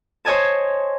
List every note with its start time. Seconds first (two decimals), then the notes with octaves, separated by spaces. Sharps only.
0.25 C5 C#5 D#5 G#5 A5